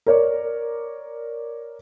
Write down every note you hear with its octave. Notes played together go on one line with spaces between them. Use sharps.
A#4 C#5 D5